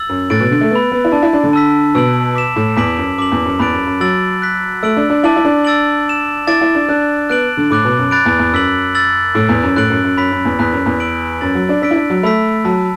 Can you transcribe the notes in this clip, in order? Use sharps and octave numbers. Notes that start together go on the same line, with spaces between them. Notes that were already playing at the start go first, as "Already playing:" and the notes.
Already playing: E6 A6 F#7
F#2
A2 F#6 A6 D7 F#7
B2
D3
A3
B3 B5 E6 A6
B3
E4
D4 A5 E6 A6
E4
D4
D3
A5 E6 B6
B2 E6 D7 F#7
D6 B6 E7
A2
E2 D6 B6 D7 F#7
F#2
F#2 D6 B6 F#7
E2
F#2
E2 B5 F#6 A6 D7
F#2
F#2
F#3 E6 A6 D7 F#7
F#6 B6 F#7
A3 E6 D7 F#7
D4
D4
E4 A5 D6 A6 D7 F#7
E4
D4
E6 A6 D7 F#7
E6 A6 E7
E4 A5 D6 A6 D7
E4
D4
D4 A5 F#6 D7
B3 F#6 D7 F#7
D3
A2 B5 D6 F#6 A6 F#7
B2
F#2
B5 F#6 A6 D7
E2
E2
F#2 E6 B6 F#7
E6 A6 F#7
A2 E6 D7 F#7
E2
F#2
A2 F#6 A6 D7 F#7
F#2
F#2
F#2 B5 F#6 B6
F#2
E2
E2 B5 F#6 B6
F#2
E2
E6 D7 F#7
F#2 E6 A6 F#7
F#3
D4
D4 E6 B6 D7
E4
D4
F#3
A3 B5 E6 B6
F#3 A5 E6 B6